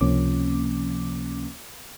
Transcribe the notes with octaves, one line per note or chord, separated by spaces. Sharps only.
C#2 C3 F3 A#3 C#4 D6